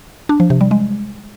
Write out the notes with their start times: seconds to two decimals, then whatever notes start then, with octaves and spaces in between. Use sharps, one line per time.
0.29 D4
0.40 F3
0.50 C3
0.61 G3
0.71 G#3